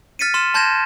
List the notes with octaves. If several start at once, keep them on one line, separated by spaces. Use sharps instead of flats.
F6 A6 B6 C#7 D#7
C6 F6 E7
A5 C6 G6 G#6 A#6 E7